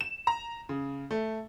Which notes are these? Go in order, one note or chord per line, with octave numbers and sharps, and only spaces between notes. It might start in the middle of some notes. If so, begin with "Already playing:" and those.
E7
A#5
C#3
A3